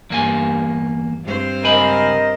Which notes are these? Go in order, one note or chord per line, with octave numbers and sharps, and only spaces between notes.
E2 G2 A#3 G#5
G2 C4 C5
C#2 A#4 D#5 G#5 B5